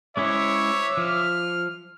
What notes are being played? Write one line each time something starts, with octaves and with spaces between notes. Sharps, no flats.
G#3 C#4 E4 C#5 E5 D6
F3 F6